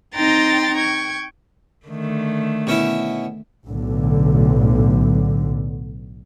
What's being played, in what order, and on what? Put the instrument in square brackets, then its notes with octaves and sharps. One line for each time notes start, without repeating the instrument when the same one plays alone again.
[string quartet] C4 D#4 G5 A#5 C6 A6
G5 C#6 G#6
[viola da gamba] D3 D#3 A3
[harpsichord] B2 C#4 E4
[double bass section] B1 A2 D3